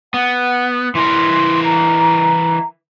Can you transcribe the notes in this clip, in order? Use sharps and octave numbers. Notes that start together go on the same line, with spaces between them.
B3 F#5
E3 E4 A#4 C6
A#5